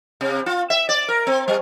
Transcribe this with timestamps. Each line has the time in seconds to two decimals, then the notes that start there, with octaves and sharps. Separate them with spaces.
0.21 C3
0.46 F4
0.70 E5
0.89 D5
1.08 A#4
1.27 C4
1.48 G3